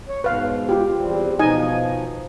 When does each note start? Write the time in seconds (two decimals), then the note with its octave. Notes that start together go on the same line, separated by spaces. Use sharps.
0.09 C#5
0.24 G#2 B2 B4 F5
0.69 F4 G4
0.98 E2 G3 C4
1.39 B2 F3 D#4 D#5 G#5